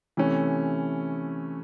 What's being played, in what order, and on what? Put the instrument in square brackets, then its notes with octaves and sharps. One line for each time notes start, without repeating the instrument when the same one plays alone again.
[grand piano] C3 E3 A3 C#4